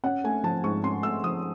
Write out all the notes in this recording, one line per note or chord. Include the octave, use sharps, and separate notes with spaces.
C#4 F#5
A3 G#5
F3 A5
G#2 C#6
C#4 C6
A3 E6
F3 D#6